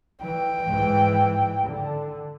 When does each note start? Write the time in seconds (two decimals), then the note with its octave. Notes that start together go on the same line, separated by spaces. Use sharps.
0.21 E3 G5
0.69 G#2 E3
1.64 D3